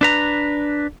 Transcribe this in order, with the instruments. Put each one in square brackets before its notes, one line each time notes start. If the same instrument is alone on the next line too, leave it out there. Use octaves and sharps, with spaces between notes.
[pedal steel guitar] D4 B4 A#5